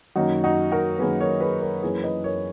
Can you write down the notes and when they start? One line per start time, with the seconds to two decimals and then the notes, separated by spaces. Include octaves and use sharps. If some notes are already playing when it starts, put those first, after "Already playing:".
0.16 F#2 D#3 A#3 D#4 F#4
0.44 D#4 F#4
0.72 F#4 A#4
0.99 F#2 D#3 A#3 G#4 B4
1.20 A#4 C#5
1.40 G#4 B4
1.61 A#4 C#5
1.82 F#2 E3 A#3 G#4 B4
2.03 B4 D#5
2.24 A#4 C#5